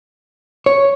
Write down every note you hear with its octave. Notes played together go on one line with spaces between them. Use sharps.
C#5